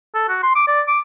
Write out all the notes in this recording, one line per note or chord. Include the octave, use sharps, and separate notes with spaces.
A4
F#4
C6
D6
D5
D6